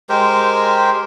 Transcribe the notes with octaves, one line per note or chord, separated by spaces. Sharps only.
G#3 G4 A#4 C5